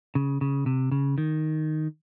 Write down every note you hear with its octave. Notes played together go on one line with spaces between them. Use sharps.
C#3
C#3
C3
C#3
D#3